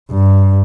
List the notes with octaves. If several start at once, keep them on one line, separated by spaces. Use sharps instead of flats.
G2